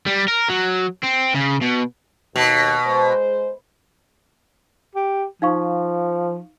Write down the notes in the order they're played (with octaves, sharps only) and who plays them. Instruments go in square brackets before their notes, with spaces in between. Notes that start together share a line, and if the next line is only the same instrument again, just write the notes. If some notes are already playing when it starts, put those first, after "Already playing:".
[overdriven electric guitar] G3
A#4
F#3
C4
C#3
B2
[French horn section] D#2 [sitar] B2
[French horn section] G#3 C5
[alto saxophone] G4
[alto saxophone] F3 [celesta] D#4 F5 C#6